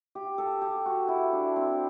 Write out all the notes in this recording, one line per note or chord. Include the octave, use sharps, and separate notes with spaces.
G4
A4
G4
F#4
E4
D4
C4